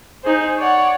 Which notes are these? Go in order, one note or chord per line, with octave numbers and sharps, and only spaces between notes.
D#4 G#4 C5
C#5 D5 F#5